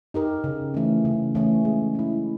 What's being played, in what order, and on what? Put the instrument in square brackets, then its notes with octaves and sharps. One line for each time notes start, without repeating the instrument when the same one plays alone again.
[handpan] D#4 G4 A#4
C#3
E3 A3 C#4
C#3
E3 A3 C#4
G#3
C#4 E4